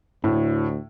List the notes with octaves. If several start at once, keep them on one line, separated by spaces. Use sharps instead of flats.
D2 A2